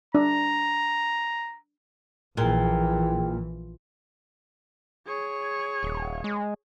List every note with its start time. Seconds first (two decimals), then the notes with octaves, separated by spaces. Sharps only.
0.15 D4 A#5
2.37 A#1 A#2 E3 E4 G#4 G5
5.07 G#4 C#5
5.83 D#1
6.24 G#3